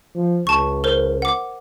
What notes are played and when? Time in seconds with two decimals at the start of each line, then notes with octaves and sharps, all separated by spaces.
0.15 F3
0.47 C#2 A5 C#6
0.84 A#4 C5
1.22 F#5 D6